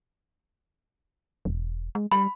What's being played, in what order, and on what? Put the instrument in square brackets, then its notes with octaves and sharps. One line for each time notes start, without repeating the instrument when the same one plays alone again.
[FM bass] E1
G#3
[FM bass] G3 [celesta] B5